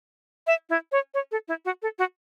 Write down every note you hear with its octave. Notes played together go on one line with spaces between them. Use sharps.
E5
E4
C#5
C#5
A4
E4
F#4
A4
F#4